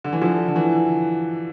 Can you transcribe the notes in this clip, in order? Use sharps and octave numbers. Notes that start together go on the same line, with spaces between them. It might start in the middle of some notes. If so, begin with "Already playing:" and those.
D3
E3
D3 F3
D3
E3